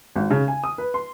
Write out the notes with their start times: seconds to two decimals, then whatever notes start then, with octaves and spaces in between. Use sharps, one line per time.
0.16 G#1
0.31 C#3
0.48 G#5
0.64 D#6
0.78 B4
0.94 C6